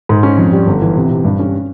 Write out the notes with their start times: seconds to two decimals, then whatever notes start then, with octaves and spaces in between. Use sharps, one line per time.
0.09 G#2
0.23 C#4
0.38 F2
0.52 G3
0.67 G1
0.82 E3
0.96 C3
1.10 C3
1.25 G2
1.39 C#4